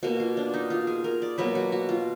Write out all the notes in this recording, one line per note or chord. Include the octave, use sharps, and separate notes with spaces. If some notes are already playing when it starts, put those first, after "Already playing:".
B2 A#3 F#4
F4
D4
D#4
F4
G#4
A#4
D5
B2 F#3 A#3 B4
F#4
F#4
F4